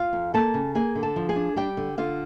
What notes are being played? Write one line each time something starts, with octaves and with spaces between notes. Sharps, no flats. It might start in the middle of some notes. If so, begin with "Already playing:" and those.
Already playing: F4 F5
F2
A#3 A4 A5
C#3
A#3 G#4 G#5
D3
A4 A5
F3
G#4 G#5
D4
G3 G4 G5
D3
D3 F4 F5